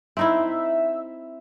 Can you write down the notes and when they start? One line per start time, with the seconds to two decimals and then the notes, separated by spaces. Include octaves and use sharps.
0.17 C4 D#4 E4 E5